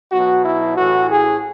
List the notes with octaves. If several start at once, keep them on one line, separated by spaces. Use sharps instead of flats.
B1 B2 F#3 F#4
E4
A1 A2 E3 F#4
G#4